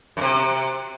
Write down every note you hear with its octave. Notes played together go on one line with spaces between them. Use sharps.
F#2 C3